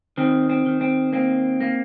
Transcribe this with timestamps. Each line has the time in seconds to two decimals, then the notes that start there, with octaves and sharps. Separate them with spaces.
0.17 D#3 C4
0.49 C4
0.66 D#3
0.81 C4
1.12 A#3 C4
1.61 A#3